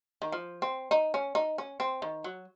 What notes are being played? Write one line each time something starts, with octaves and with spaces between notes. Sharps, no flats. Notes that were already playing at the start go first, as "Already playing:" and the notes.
D#3
F3
C4
D#4
C#4
D#4
C#4
C4
D#3
F#3